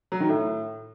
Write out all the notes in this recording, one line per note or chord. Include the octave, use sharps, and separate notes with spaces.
F#3
D#3
A2